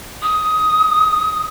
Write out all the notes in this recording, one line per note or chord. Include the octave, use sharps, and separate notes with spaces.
D#6